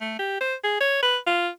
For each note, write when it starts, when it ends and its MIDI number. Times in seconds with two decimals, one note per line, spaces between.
0.01 0.16 57
0.19 0.36 67
0.41 0.55 72
0.64 0.78 68
0.81 1.02 73
1.02 1.18 71
1.26 1.49 65